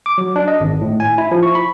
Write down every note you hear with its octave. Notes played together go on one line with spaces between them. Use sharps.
D6
F#3
D4
D#5
G#1
A2
G#5
E4
F3
C#6
B5